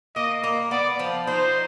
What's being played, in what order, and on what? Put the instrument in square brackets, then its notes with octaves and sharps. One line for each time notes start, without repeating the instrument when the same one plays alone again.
[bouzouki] A#3 [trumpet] D#5
[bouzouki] A#3
[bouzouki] B3 [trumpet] D5
[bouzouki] F3
[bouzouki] D#4 [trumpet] C5